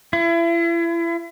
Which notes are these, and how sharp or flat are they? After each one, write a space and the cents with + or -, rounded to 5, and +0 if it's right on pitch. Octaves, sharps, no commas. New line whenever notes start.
E4 +35